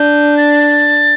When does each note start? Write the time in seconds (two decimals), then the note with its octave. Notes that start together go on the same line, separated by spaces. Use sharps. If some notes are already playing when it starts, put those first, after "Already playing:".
Already playing: D4 G6
0.37 A6